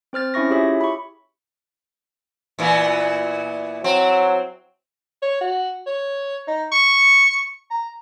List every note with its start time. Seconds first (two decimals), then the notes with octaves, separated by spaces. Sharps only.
0.13 C4 C5 F6 A6
0.34 C#4 E4 E5 C#6 A#6
0.49 E4 F4 G4 G#4 C#5 E5
0.81 B5 C#6
2.59 A#2 E3 B3
3.84 F#3 C4
5.22 C#5
5.41 F#4
5.87 C#5
6.48 D#4
6.72 C#6
7.71 A#5